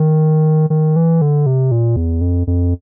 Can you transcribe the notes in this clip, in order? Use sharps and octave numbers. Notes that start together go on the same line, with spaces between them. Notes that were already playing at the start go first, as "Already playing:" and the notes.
Already playing: D#3
D#3
E3
D3
C3
A#2
E2
F2
F2